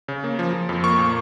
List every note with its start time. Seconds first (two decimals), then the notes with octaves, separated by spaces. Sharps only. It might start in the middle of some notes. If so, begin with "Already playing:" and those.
0.08 C#3
0.24 A#3
0.39 F3
0.54 F3
0.69 F2
0.84 A#3 C#6
0.99 A#2